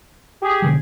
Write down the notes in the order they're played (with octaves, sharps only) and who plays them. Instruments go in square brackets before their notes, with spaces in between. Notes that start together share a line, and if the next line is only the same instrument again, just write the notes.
[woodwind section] G4 G#4
[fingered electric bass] B2 D3 F#3